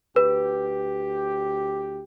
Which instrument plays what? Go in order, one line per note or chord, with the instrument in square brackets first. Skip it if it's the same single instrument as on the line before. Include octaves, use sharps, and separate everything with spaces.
[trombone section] D2 G4 [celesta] B4